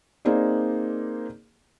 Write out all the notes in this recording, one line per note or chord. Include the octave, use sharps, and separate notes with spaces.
A#3 C4 D#4 G#4 D5